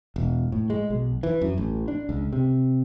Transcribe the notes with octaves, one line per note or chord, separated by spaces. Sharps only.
E1
A2
G#3
B1
E3
F#2
A1
D4
C#2
C3